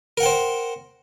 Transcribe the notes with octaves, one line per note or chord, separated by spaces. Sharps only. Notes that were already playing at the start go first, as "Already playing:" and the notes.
A#4 C5 F#5 G5